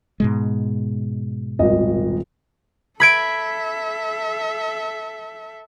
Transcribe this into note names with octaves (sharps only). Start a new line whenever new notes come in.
G#2 B2 G#3
D#1 G#1 D#5
A4 E5 B5 G#6 D7